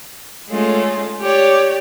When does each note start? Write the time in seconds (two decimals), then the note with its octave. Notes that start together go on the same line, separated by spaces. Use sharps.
0.50 G#3 A3 C#4 F4
1.20 G4 C#5 D5